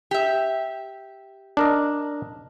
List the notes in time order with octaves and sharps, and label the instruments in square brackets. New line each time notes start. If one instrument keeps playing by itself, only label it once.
[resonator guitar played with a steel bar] G4 E5
[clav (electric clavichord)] D4 A#4 D#5